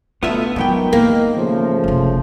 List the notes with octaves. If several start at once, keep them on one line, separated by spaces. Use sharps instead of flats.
B2 A3 B3 D4 F4 E5
G#2 D#3 F#3 B3 G5
E3 A#3
C#3 F3 A3
F#1 C3